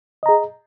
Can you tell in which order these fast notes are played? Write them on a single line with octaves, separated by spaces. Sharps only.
D#5 A#5 G#4